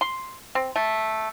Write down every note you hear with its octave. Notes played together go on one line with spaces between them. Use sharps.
C6
C4
A3